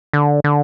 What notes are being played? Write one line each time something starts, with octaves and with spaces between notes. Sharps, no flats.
D3
D3